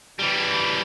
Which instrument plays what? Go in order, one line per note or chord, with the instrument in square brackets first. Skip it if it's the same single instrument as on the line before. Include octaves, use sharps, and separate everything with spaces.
[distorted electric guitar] E3 G3